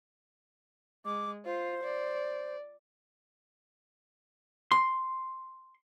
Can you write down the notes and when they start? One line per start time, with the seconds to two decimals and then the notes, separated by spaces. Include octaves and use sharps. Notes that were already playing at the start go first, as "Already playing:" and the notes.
1.05 G#3 D6
1.45 F4 C5
1.84 D5
4.72 C6